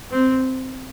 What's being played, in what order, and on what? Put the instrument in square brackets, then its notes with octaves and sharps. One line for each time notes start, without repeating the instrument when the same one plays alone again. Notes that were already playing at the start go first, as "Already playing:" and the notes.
[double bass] C4